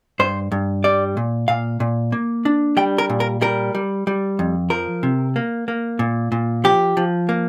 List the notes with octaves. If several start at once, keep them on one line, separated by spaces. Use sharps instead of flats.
G2 C5
G2
G3 D5
A#2
A#2 F5
A#2
A#3
D4
G3 G5
A#4
A#2
A#4
G3 A#4
G3
G3
F2
F3 A#4
C3
A#3
A#3
A#2
A#2
F3 G4
F3
A#3